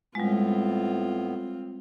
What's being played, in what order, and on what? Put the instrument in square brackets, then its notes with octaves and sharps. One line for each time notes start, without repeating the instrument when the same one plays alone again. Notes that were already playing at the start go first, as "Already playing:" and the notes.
[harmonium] A2 B3 [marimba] G3 G#3 [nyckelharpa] C4 F4